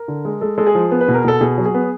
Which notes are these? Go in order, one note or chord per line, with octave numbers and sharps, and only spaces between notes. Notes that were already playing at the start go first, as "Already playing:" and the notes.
Already playing: A#4
D3
G#3
G#3 A4
G#3 A4
G#4
F3
B3
B4
B2
A#4
B2 A4
B2 G#4
F#3
G#4
B3